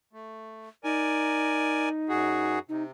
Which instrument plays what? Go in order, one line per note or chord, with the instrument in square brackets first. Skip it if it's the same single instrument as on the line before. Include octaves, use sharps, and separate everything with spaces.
[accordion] A3
[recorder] D#4 [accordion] A#4 D5 G#5
[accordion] F#2 F#4 G#4
[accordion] C3 [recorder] D#4